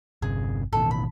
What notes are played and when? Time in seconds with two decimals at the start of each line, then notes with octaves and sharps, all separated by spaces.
0.22 G1 C3 G#4
0.73 A1 B2 D#3 A4
0.91 B5